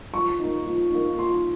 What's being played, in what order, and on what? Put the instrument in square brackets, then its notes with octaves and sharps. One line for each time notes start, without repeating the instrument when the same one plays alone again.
[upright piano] F3 C#6
A#3 D#4
F3
A#3 D#4
F3 C6